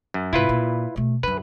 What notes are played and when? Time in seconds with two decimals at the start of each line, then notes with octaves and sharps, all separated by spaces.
0.14 F#2
0.33 G#2 C3 E4 F4 B4
0.49 A#2
0.96 B2 A3
1.23 F#2 D3 B4